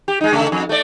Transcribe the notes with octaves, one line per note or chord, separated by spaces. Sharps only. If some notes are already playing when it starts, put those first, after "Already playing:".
G4
G#3 D#4
C#3 A3
F2
A3 D5